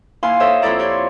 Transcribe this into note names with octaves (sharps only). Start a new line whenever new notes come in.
D#2 E4 F5 G#5 C6
A4 C5 C#5 D#5 E5
F2 C4 E4 A4 D5 A#5
G4 C#5 D5 C6